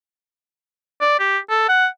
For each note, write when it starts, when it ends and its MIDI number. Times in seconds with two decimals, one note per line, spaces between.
1.01 1.18 74
1.19 1.38 67
1.50 1.66 69
1.69 1.87 78